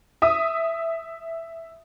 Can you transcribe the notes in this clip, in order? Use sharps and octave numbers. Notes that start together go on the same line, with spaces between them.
E5 D#6